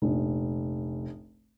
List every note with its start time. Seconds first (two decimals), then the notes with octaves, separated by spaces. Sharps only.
0.02 F1 A#1